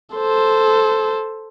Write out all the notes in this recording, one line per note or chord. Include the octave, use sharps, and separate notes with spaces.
A4 C5